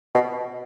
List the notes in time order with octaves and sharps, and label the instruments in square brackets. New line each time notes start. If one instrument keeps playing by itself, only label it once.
[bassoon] B2